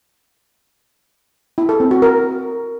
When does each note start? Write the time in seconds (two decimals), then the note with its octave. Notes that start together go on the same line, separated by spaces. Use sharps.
1.58 E4
1.69 A4
1.80 C4
1.91 F#4
2.02 A#4